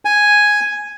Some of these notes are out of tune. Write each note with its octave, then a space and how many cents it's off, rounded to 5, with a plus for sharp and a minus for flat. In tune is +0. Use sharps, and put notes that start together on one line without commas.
G#5 +0